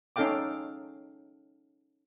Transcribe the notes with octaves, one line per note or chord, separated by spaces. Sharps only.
C#4 D#4 A4 F5 G5 D6